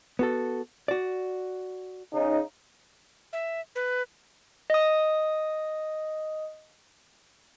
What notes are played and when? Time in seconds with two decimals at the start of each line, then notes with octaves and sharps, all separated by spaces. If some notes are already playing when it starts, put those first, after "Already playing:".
0.19 B3 F#4 A4
0.88 F#4 D5
2.13 C#3 D#4
3.33 E5
3.75 B4
4.70 D#5 D#6